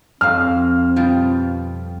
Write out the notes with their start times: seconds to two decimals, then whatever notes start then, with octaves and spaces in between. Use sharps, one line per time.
0.21 F2 C4 D#5 F5 F6
0.96 B2 G3 F4